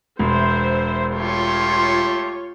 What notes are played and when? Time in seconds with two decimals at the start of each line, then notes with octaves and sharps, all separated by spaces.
0.19 E1 C5 E5
1.13 A3 F4 G4 C#5 C6